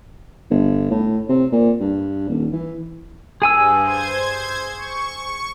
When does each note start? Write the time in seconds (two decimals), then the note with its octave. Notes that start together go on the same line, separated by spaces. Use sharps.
0.50 G1
0.90 A2
1.29 C3
1.52 A#2
1.80 G2
2.29 D#1
2.52 E3
3.42 G2 G#4 G#5 E6
3.83 C5 G#6
4.77 C#6